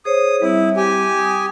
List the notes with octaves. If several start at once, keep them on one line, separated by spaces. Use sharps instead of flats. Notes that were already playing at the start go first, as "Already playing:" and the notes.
G#4 C5 C#5 D#6
G3 C4 E4
G4 G#5
D#6